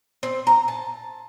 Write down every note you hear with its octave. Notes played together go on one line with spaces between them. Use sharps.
C4
A#5
A5